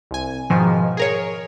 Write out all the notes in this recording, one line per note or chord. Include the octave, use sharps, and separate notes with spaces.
C2 G#5
G#2 B2 D#3 F3
G#4 A#4 C#5